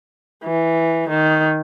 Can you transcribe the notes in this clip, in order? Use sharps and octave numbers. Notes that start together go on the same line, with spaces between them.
E3
D#3